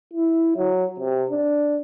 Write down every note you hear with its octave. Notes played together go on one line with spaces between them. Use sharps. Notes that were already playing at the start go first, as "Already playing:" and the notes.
E4
F#3
C3
D4